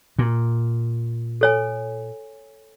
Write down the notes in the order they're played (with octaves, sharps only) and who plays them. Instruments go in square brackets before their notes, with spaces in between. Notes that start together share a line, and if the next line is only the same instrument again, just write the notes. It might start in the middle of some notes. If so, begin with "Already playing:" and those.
[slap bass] A#2
[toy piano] A4 C#5 G#5